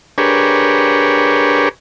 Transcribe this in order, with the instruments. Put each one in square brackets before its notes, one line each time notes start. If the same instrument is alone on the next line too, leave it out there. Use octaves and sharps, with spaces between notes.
[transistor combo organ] D4 G4 G#4 A#4 B4 C#5